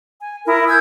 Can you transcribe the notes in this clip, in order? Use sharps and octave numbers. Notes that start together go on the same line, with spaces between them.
G#5
E4 A#4 D#6
G#5 E6 G6 G#6